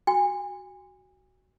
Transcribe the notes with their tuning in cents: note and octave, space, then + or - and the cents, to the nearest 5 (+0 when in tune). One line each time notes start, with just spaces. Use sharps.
F#4 +10 G#5 -30